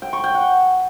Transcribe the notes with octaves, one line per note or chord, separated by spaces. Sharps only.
G5
C#6
G5
F#5